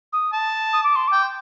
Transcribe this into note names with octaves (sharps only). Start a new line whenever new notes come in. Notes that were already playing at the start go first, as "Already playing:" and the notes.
D#6
A5
D#6
D6
C6
G5 D6